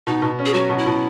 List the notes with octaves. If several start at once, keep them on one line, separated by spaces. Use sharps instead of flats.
B2 D#4
B2
C#4
G#4
F#3 F#4
B2
E4
B2